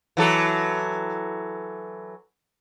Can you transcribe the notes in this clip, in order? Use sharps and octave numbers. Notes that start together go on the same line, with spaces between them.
E3 F#3 A4